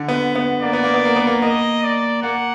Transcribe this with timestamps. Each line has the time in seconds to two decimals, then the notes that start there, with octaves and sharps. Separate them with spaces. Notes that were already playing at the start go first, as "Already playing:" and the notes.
Already playing: D3
0.08 B3
0.36 B3
0.62 A#3 D5
0.73 B3
0.83 A#3
0.94 B3
1.05 A#3
1.16 B3
1.27 A#3
1.42 A#3 D#5
1.83 D5
2.23 A#3 F#5